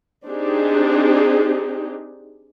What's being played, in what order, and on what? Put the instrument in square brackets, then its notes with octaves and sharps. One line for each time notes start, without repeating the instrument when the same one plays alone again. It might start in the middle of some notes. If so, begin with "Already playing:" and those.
[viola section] C4 D4 D#4 G4 G#4